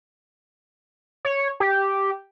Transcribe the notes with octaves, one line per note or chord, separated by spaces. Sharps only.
C#5
G4